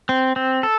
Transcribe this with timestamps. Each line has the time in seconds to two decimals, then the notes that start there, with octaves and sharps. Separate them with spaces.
0.09 C4
0.36 C4
0.63 A4